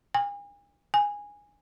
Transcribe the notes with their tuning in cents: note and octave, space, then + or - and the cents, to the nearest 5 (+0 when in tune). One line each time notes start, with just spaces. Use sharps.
G#5 -40
G#5 -15